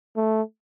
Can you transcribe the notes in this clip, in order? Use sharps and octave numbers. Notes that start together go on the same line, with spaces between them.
A3